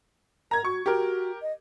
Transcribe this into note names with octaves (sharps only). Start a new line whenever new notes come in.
A#4 A#5 G#6
F#4 C#6
F#4 G4 A#4
D#5